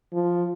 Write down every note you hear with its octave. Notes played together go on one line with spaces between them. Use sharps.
F3